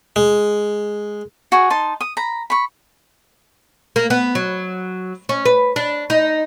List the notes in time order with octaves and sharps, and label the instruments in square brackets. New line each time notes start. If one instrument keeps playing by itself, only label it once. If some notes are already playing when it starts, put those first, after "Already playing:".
[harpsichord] G#3
[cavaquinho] F#4 G#4
D#4 A5 C6
D#6
A#5 B5
B5 C#6
[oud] A#3
B3
F#3
C#4
B4
D4
D#4